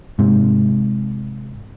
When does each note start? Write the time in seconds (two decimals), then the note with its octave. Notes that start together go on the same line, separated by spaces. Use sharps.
0.19 G#2 C3